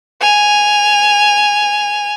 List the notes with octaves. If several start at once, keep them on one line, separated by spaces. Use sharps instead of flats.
G#5 F7